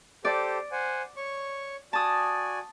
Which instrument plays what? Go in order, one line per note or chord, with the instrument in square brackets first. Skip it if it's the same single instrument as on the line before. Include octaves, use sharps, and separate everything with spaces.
[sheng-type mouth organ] G4 A4 C5 [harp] D5
[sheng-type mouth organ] C5 F#5 G#5
C#5 C#6
[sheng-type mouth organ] F#4 D5 G#5 [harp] A5 D#6